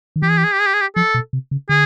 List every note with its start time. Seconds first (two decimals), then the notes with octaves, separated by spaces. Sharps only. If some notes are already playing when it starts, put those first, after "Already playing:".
0.16 D#3
0.22 E3 G4
0.30 G#4
0.37 G4
0.44 G#4
0.52 G4
0.59 G#4
0.66 G4
0.74 G#4
0.81 G4
0.96 F3 A4
1.14 B2
1.33 C3
1.51 C#3
1.69 D3 G#4